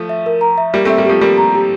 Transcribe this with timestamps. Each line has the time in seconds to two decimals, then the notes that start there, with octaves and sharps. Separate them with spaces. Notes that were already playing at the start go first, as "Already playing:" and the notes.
Already playing: F3 A3
0.09 E5
0.26 A#4
0.41 A#5
0.58 E5
0.74 G3 A#3 G4
0.85 A3 C4
0.90 E5
0.98 G3 A#3
1.05 F3 A3 G4
1.21 G3 A#3 G4
1.38 A#5
1.55 G4